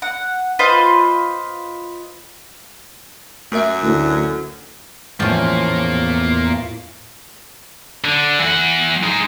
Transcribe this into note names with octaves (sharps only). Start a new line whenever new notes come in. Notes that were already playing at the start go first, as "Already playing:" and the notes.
F#5
F4 B4 C5 D#5
F#2 A3 A#4 E5
D2 A2
E2 A2 F3 A#3 C#4 F4
D3
E3 F#5
G#3 D#4